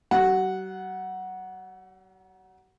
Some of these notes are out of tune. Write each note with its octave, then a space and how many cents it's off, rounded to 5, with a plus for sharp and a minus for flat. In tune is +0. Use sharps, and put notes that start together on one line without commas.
F#3 +45 F#5 +0